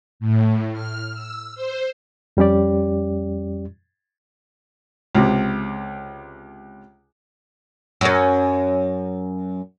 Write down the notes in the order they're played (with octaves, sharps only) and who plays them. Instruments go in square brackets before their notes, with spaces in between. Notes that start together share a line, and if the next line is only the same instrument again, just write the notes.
[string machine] A2
F6
E6
C5
[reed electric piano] F2 G3 C#4 G4 D5
[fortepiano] C#2 C3
[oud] F#2 C#4